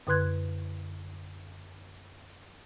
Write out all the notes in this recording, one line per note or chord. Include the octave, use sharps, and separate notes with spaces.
F#2 D3 B4 C6 F#6 G#6